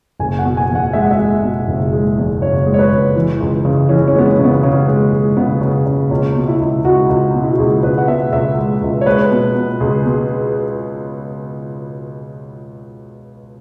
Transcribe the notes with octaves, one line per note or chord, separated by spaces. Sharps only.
F#1 G#5
F#5
B2
G#5
E2
F#5
G#3 E5
F#5
E5
G#3
B2
F#1
G#3
E2
F#1 C#5
G#3
C#5
B4
F#1
E3
C#2
C#3
E3 C#4
C#4
G#3 B3
C#4
C#3
B3
C#3 C#4
G#3
G#3
C#3 B3
C#3
C#3
C#2 C#4
B2
E4
C#2
C#2 F#4
C#2
B2
E4
F#4
C#2 G#4
C#2 B4
F#5
B2 E5
C#2 E5
G#3
C#2
C#5
G#3 B4
B2
B2
C#2 G#4
B2